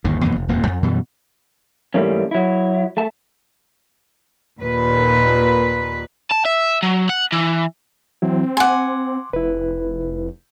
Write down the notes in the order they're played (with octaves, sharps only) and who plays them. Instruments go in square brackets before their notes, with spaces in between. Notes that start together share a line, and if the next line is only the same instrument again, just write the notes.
[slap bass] G1 D#2 D#3
F2 B2 E3 A#3
F1
D#1 F2 A2 A#3
F2
F#2 B2 E3 G3
[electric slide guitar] G#2 E3 G3 A3 A#3 C#4
F#3 E4
A3 A5
[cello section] D#2 A#2 B4
[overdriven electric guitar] A5
E5
F#3
F#5
E3
[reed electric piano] E3 F#3 E4 [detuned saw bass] C4
[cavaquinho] F#5 G#5 [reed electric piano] C6 D6
[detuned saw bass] F1 [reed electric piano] E4 B4